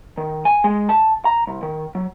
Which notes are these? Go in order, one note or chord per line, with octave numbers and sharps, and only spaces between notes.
D#3
G#5
G#3
A5
A#5
C2
D#3
F#3